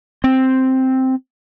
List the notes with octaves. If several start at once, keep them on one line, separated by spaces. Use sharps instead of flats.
C4